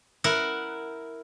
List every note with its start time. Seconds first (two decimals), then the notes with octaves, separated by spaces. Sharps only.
0.24 E4 A#4 F#5